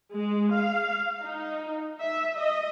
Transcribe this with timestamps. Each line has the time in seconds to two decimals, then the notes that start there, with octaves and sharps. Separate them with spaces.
0.14 G#3
0.55 F5
1.22 D#4
2.00 E5
2.37 D#5